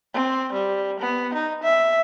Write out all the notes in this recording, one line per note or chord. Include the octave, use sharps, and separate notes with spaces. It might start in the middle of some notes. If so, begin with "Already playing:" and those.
C4
G3
B3
D#4
E5